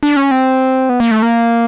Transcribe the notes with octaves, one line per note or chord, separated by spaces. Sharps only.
D4
C#4
C4
B3
A#3
A3
A#3